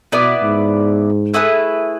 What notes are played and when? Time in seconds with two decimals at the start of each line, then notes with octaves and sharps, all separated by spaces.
0.12 B2 B3 E4 B4 D5
0.42 G#2
1.34 A3 E4 G#4 B4